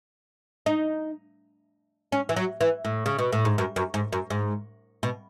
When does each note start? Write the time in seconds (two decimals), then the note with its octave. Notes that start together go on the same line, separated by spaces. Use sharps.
0.66 D#4
2.12 C#4
2.29 E3
2.36 F#3
2.61 E3
2.85 A2
3.06 C#3
3.18 B2
3.32 A2
3.45 G#2
3.58 F#2
3.76 F#2
3.94 G#2
4.12 F#2
4.30 G#2
5.03 B2